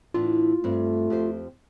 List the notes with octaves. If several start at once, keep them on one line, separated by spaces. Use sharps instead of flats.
A2 E3 D4 F4
G2 A3 C4
F2 G4 C5